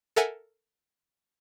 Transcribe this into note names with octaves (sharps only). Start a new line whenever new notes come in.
A4 A#4 E5 F#5 G#5